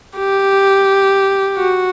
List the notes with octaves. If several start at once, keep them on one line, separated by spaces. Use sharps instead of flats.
G4
F#4